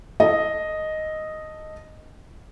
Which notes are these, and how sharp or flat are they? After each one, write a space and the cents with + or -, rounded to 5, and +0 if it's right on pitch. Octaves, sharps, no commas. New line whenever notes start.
A4 +0 D#5 +0